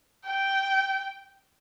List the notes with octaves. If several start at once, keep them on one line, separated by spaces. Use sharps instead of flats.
G5